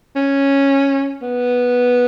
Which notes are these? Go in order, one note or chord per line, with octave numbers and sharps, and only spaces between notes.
C#4
B3